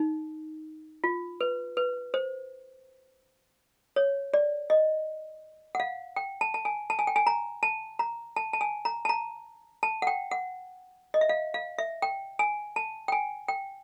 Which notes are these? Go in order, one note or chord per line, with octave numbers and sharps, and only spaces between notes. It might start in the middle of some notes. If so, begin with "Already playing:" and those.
Already playing: D#4
F4
B4
B4
C5
C#5
D5
D#5
F#5
F5
G5
A5
A5
G#5
A5
G#5
G5
G#5
A#5
A5
A#5
A5
A5
G#5
A#5
A5
A#5
A5
F#5
G5
F#5
D#5
E5
F5
F5
E5
G5
G#5
A5
G5
G#5
G5